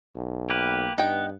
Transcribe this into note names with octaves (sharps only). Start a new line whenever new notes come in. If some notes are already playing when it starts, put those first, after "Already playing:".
B1
A#3 G4 B4
G2 B3 D#4 G5